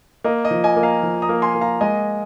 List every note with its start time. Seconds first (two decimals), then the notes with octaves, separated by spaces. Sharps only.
0.24 A#3 D#5
0.45 D#5
0.51 F3
0.64 D#5 G#5
0.77 A#3
0.83 F5 A#5
1.03 F3
1.22 A#5 D#6
1.29 A#3
1.42 G#5 C6
1.55 A#3
1.61 F5 A#5
1.81 G#3 D#5 G#5